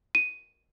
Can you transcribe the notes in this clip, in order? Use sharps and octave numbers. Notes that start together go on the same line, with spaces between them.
D#7